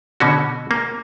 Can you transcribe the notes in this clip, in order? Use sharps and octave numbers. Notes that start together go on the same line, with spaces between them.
B2 D3 C#4 F#4
A#3